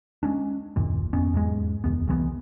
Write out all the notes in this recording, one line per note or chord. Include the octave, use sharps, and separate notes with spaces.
G#3 C#4 D4
F#1 D#2 A#2
G#1 F2 B3 C#4
E2 G#2 G#3
F1 D#2 B3
C2 E3 F#3 B3